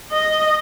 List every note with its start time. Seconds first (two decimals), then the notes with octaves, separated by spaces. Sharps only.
0.12 D#5